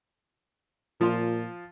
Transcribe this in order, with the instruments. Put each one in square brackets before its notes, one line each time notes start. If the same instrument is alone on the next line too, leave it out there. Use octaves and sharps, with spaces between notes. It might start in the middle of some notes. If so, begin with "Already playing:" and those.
[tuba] A#2 [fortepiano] F3 F4